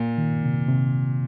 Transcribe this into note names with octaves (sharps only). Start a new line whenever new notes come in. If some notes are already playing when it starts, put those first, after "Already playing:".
Already playing: A#2 A#3
D#3
C3
C3